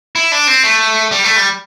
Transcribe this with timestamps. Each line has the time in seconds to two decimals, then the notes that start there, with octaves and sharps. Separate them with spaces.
0.16 E4
0.32 D4
0.47 C4
0.64 A3
1.11 G3
1.24 A3
1.36 G3